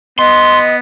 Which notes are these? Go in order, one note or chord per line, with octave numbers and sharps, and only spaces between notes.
B3 D#5 C6